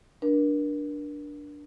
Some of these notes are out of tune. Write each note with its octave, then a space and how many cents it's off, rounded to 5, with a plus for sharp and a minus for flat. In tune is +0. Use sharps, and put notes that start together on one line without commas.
D4 +0 A#4 +35